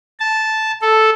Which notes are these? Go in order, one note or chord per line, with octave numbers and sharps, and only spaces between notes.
A5
A4